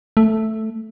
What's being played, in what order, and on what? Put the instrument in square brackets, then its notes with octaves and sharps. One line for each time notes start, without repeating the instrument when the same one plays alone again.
[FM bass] A3